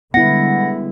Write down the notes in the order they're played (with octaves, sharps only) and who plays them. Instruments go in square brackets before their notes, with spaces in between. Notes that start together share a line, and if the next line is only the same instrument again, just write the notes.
[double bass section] D3 G3 G#3 [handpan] B3 E4 [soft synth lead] F#5 [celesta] A#6